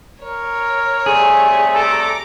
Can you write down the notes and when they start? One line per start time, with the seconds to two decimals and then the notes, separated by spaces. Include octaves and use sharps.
0.22 A#4 C#5
1.06 C3 G3 A3 G#4
1.75 A4 A#5 D6